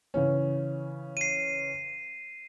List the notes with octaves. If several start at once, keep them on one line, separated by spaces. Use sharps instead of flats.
C#3 E3 C#4
C7 D#7